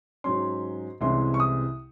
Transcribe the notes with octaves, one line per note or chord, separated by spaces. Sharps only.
G#2 F#3 C#4 C6
C2 C3 E3 G#3 C#4 C6
C#6
D#6